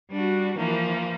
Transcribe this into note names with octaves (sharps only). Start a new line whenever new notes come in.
G3 D4 F#4
E3 F3 A#3